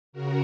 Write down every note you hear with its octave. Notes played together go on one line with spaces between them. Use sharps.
C#3 F#4 A#4